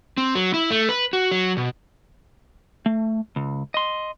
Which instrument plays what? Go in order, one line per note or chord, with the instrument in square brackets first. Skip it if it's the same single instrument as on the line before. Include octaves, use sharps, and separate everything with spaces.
[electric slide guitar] C4
F#3
E4
A3
B4
F#4
F#3
B2
[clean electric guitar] A3
C#2
D#5 C6